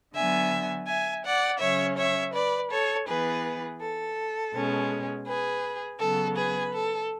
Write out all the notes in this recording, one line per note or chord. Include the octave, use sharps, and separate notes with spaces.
D3 F#3 B3 E5 G#5
E5 G#5
D5 F#5
C#3 F#3 C#4 C#5 E5
C#5 E5
B4 D5
A4 C#5
E3 B3 G#4 B4
A4
B2 G#3 C#4
G#4 B4
C#3 F#3 B3 A4
G#4 B4
A4